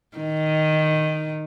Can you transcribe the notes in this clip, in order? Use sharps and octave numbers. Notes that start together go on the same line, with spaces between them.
D#3